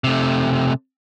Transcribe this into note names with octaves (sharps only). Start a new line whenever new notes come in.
C3 A3